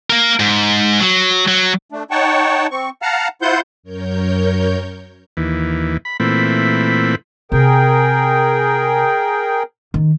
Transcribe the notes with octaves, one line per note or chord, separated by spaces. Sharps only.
A#3 A#4
G#2
F#3
F#3
A3 D4
D#4 C#5 F#5 G5 A5 C#6
C4 C#6
F5 F#5 A5 A#5 F6
E4 F4 C5 F#5 C6 G6
F#2 A#4 C#5 G6
D#2 E3
B5
A#2 E3 A3 C4 B5
C3 G#4 A#4 G5
D#3